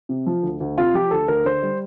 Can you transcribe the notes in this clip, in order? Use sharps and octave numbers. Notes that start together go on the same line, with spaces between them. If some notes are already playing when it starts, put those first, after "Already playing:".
C3
F3
D2
D2
C3 F4
F3 G4
D2 A4
D2 A#4
D3 C5
G3